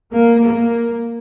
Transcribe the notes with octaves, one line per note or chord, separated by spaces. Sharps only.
A#3
A#3